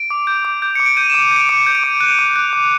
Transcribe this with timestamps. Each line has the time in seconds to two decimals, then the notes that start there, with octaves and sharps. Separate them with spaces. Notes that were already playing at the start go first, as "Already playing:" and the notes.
Already playing: D7
0.10 D6
0.27 G6
0.45 D6
0.62 G6
0.75 D6 C#7
0.86 D7
0.97 G6 D#7
1.10 D6 E7
1.22 D#7
1.31 G6 D7
1.49 D6 C#7
1.67 G6
1.75 D7
1.84 D6
2.00 F#6 D#7
2.19 D6
2.36 F#6
2.53 D6